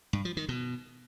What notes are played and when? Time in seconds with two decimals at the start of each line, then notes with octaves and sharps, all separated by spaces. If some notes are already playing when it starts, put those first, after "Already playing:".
0.13 G2
0.25 F3
0.37 D#3
0.49 B2